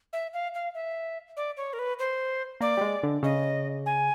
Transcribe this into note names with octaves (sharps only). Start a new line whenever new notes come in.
E5
F5
F5
E5
D5
C#5
A#4
B4
C5
A#3 D5
G3
G#3
D3
C#3 D#5
G#5